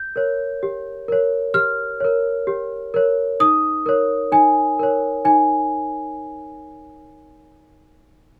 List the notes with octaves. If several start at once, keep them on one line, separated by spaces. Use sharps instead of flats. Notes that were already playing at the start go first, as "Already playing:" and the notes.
Already playing: G6
A#4 C#5
G4
A#4 C#5
G4 F6
A#4 C#5
G4
A#4 C#5
D#4 D#6
A#4 C#5
D#4 G#5
A#4 C#5
D#4 G#5